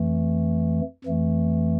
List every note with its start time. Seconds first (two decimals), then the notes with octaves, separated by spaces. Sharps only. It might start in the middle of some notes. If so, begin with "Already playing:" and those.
Already playing: F2 E3 A3
1.04 F2 E3 A3